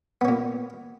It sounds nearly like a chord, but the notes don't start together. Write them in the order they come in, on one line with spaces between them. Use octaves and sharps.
B3 C#4 A#2